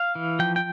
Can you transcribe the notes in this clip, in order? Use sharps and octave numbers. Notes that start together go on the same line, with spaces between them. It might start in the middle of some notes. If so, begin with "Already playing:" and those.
Already playing: F5
E3
F3 G5
G5